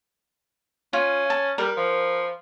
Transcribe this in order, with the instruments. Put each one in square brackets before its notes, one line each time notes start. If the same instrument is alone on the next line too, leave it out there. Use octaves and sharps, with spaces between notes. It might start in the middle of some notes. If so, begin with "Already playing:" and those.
[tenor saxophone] C#4 [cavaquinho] F4
[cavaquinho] A5
[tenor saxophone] G3 [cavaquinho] A#4 B4
[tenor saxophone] F3